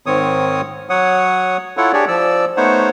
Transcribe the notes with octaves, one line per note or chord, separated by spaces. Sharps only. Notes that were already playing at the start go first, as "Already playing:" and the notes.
G#2 D#3 C4 C#5 D#6
F#3 C#5 F#5 D#6
E4 F4 A4 C#5 F#5
D4 G4 G#4 C#5 D5
F3 D5 E6
A3 B3 D#4 C5 C#5 F#5